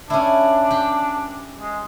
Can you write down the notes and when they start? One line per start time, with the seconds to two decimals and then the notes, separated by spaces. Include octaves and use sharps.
0.10 C#4 D4 E4
0.70 G4
1.61 G#3